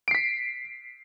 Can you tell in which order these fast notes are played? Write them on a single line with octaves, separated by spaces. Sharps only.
D7 C7 B6